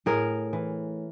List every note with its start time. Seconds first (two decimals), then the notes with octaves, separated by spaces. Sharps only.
0.06 A2 G#4 A#4
0.53 E3